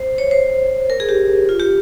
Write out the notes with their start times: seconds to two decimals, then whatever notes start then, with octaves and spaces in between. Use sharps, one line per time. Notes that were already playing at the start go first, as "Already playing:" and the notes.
Already playing: C5
0.18 C#5
0.31 C5
0.90 A#4
1.00 G#4
1.09 G4
1.49 F4
1.60 G4